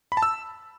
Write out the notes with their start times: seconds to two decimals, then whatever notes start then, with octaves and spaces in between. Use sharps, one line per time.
0.12 B5
0.17 A5
0.22 E6